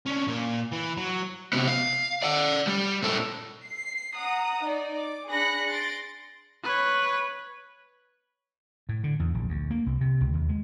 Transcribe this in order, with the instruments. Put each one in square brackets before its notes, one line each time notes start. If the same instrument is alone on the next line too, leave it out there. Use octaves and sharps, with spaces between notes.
[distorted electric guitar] C#4 D4
A#2
E3
F#3
[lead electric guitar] C3 B3
F5
D5 F#5
G3
A#2 A4
[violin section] C7
F#5 A#5 D#6
D#4 D5
D6
D4 G#4 B5 F#6 A#6 C#7
C6 A6 A#6 D7
[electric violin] B4 C#5
[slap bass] A2
D3
E2
A#1
D2
A#3
C2
C3
C#2
D#2
G#3